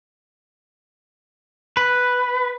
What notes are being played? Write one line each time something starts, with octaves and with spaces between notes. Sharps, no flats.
B4